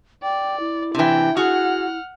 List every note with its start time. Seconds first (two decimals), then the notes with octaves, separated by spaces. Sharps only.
0.23 D5 G5
0.60 E4
0.95 C3 E3 D4 G5
1.37 F#4 G#4 F#5 F6